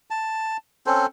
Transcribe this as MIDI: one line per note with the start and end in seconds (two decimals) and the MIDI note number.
0.10 0.57 81
0.86 1.06 60
0.86 1.06 61
0.86 1.06 69
0.86 1.06 72